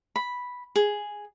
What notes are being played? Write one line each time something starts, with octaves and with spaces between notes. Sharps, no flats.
B5
G#4